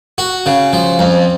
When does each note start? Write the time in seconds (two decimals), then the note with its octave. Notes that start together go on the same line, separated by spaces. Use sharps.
0.18 F#4
0.46 C#3
0.73 F3
0.99 F2